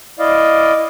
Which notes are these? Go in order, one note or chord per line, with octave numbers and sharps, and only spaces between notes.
E4 D5 D#5 F5